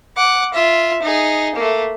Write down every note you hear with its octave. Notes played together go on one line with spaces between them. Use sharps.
F#5 D6
F4 E5
D#4 G#4
A3 A#3